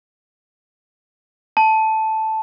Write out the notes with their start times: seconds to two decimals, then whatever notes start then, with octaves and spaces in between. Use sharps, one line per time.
1.57 A5